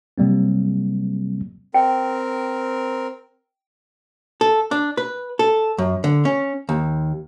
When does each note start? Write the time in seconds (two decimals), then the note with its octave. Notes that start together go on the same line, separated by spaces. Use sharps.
0.18 C3 F#3 G3 A#3 C4
1.74 C4 A#4 G5
4.41 A4
4.71 D4
4.97 B4
5.39 A4
5.78 F#2
6.04 D3
6.25 C#4
6.69 D#2